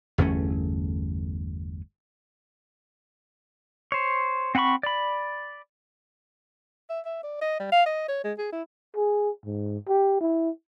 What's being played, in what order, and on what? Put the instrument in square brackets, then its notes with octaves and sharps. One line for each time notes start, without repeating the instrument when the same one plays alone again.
[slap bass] G1 E2 A3 C#4
[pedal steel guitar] C5 C#5
C4 F#5 G#5 B5 C#6
D5 B5
[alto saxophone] E5
E5
D5
D#5
G3
F5
D#5
C#5
G#3
G#4
E4
[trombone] G#4
G#2
G4
E4